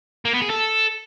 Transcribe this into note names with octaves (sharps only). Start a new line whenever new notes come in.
A#3
B3
G#4
A4